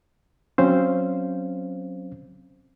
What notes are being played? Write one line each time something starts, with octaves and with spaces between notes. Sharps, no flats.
F#3 C4 C#4 C5 F5